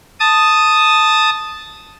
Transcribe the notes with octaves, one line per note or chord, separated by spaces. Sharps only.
A5 D#6